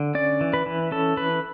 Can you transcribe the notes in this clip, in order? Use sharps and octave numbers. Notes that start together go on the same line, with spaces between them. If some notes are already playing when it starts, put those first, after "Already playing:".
Already playing: D3
C#4 D5
E3
B4
E3
C#4 A4
E3 B4